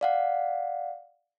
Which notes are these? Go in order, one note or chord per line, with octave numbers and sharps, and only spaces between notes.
D5 F5 F#5